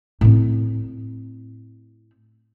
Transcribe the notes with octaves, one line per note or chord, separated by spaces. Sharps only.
A2 C4